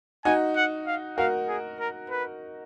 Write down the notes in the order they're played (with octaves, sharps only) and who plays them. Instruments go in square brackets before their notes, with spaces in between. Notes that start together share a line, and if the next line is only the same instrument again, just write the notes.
[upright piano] D#4 F#4 [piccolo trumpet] G#5
[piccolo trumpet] F#5
F5
[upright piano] F#4 A#4 [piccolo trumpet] F5
[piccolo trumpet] G#4
A#4
B4